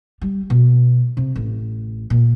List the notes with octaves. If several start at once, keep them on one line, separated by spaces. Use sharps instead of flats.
G3
B2
C3
A1
A#2